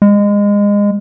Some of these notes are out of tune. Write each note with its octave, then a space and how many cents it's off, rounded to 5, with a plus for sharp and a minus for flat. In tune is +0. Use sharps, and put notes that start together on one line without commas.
G#3 -25